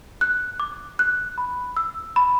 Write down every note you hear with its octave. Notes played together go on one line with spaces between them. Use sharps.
F#6
D6
F#6
B5
E6
B5